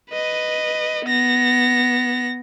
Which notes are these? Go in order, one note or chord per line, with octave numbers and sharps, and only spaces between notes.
B4 D#5
B3 A#6